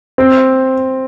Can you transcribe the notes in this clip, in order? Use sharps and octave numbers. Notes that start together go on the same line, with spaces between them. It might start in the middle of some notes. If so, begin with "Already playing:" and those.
C4